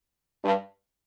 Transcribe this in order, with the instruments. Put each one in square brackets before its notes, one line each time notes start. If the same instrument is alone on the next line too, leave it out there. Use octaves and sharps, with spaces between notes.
[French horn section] G2